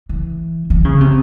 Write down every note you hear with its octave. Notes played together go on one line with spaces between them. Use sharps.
E3
E3
C#3
C3